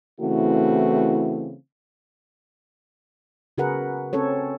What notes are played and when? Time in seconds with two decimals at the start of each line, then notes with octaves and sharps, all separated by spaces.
0.20 C#3 E3 A3 C4 E4 F#4
3.58 C#3 F#4 G#4 A#4 B4 F#5
4.13 C4 C#4 A4 C#5